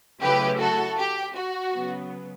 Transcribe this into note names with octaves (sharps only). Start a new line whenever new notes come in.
C#3 F#3 A3 E4 G4 B4
F#4 A4
G4
F#4
C#3 F#3 B3